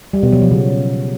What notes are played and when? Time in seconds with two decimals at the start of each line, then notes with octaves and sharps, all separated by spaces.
0.13 G3
0.23 B2
0.32 F#3
0.42 F3
0.51 C#3